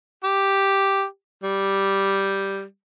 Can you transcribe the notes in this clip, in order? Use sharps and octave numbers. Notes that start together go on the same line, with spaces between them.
G4
G3